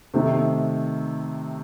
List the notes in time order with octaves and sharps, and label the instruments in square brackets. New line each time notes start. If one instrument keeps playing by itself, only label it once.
[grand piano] C3 D#3 A3 C4